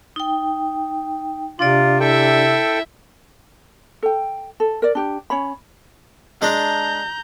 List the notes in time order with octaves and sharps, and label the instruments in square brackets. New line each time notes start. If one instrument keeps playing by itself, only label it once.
[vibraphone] D#4 G5
[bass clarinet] C3 [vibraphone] D4 D5 [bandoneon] F4
[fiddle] E4 E5 [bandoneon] A4 G5
[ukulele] A4 G5
A4
A#4 D5
D4 G4
C#4 C#5 B5
[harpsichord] G#3 D4 [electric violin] A#5 G6